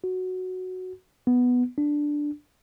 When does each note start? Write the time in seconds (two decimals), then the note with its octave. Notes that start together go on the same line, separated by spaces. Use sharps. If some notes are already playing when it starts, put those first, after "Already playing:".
0.04 F#4
1.27 B3
1.78 D4